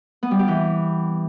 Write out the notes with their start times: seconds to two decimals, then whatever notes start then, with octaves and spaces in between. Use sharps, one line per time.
0.23 B3
0.31 G3
0.39 G4
0.48 E3